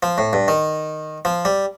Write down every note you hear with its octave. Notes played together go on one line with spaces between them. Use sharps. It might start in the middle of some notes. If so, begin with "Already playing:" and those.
F3
A2
G2
D#3
F3
G3